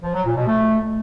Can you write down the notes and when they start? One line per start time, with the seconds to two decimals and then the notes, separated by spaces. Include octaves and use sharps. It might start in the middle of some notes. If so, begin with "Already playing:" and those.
0.03 F3
0.14 F#3
0.25 A#2
0.36 B2
0.47 A3